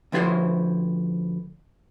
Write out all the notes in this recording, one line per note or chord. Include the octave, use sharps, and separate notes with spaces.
D2 F3 E4 F#4 C5 C#5